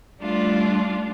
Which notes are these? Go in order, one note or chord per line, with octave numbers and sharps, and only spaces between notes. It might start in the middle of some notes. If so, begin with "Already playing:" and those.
G3 A3 D4 F4 D5